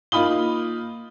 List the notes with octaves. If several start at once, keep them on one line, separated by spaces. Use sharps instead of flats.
A#3 D#4 F4 B5 D#6 G7